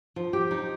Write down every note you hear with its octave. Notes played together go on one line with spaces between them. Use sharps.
F3
G4
D#4